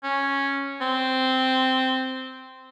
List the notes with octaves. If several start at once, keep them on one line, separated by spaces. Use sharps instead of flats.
C#4
C4